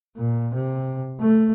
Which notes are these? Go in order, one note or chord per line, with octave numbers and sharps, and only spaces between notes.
A#2
C3
A3